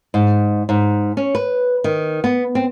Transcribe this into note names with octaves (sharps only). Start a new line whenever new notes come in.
G#2
G#2
C#4
B4
D#3
B3
C4